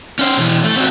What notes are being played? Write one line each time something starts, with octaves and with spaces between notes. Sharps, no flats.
C#4 C5
B2 E3
A3
C4 F#4